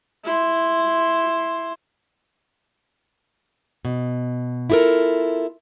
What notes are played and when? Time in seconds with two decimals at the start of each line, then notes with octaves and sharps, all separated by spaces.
0.25 E4 C6
3.85 B2
4.70 E4 F4 G4 A4 A#4